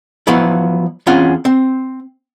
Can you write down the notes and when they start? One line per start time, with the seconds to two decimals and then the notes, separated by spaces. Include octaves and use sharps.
0.27 F3 F#3 B3 E4
1.07 E2 C4 C#4 F4 F#5
1.45 C4